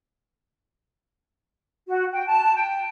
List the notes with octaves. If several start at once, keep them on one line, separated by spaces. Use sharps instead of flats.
F#4
G5
A5
G5